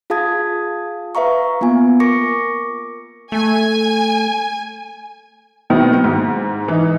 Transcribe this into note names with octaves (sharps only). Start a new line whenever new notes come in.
F4 G#4 F5 A5 D#6 G#6
B4 E5 F5 A#5 C#6
A#3 B3 F4 G#5
A#4 C#6 D6 A#6 C#7
A3 G#5
B2 D#3 F#3 B3 C4
G#2
E3 D#4